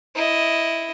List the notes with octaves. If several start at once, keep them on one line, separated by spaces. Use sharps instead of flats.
E4 D#5